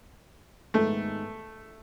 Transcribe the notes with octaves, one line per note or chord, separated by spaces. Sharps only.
G#2 D#3 G#3 A3 B3